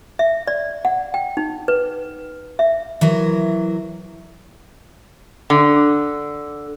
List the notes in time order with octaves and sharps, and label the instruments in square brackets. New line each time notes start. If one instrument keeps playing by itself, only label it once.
[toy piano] E5
D5
F#5
G5
D#4
B4
E5
[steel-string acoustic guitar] E3 F#3 A#4
[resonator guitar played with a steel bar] D3